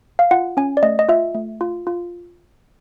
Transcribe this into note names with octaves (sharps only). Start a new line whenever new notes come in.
F5
F4 F#5
C#4 G#5
D5
A3 D#5
D#5
F4 E5
A3
F4
F4